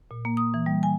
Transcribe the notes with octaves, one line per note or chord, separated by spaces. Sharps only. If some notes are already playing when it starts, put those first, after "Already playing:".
A#2
A#3
D#6
E3
G3
G#5